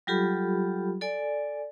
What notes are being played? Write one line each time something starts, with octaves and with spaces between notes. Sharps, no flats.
F#3 G3 F4 G4 A4 B5
A4 D5 G#5